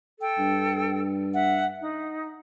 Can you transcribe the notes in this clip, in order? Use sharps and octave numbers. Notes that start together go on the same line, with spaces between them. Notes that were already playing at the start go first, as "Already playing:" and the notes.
A4 G5
G2
E5 F#5
D#4